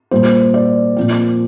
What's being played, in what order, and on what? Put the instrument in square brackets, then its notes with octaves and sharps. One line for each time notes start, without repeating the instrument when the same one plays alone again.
[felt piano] A#2 G3 A#3 C5
D5
A#2 F3 C4